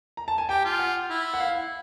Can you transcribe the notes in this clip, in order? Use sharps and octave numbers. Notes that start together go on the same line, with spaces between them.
A#5
A5
G#5
G4 G5
F4
F#5
E4
F#5
F5